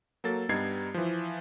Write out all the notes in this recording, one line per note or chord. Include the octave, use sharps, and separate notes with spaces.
F#3 A#3 A4 A6
G2 G3 B3 D#4 G#6 C7
E3 F3